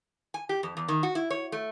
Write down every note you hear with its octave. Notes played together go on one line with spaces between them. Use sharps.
G#5
G4
F2
E2
D#3
F#4
E4
C#5
A3